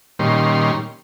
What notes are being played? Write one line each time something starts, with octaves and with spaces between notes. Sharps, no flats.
A#2 D#3 G3 C#4 C6